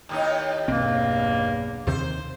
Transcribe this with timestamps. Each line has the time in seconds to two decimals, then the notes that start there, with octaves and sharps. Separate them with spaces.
0.09 D#2 A2 D#4
0.68 B1 E2 G2 A#3 C4
1.87 D#2 C3 D#3 C5